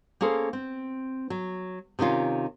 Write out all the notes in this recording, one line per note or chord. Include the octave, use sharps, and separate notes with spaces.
A#3 C#4 G#4 A4 C5
C4
F#3
C3 D#3 C#4 F4